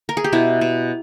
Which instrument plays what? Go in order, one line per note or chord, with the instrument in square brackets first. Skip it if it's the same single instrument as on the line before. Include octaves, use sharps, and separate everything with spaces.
[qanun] A#4
G#4
G4
B2 E4
B2